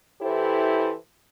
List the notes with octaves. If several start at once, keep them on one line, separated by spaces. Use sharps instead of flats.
E3 E4 G4 A4 C5